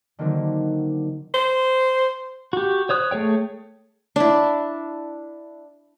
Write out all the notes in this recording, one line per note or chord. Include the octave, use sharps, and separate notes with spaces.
D3 D#3 F#3 A#3 C4 D4
C5
F#4 G4
C5 C#5 D#6 F#6
A3 G#4 C#5 G5
D4 E4